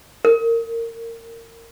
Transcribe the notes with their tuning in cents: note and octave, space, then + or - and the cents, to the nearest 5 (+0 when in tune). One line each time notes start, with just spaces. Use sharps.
A#4 -25